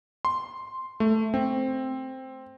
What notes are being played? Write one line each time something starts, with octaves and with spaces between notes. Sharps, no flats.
C6
A3
C4